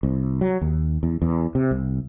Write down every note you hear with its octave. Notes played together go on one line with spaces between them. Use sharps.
C2
F#3
D#2
E2
E2
C3
C2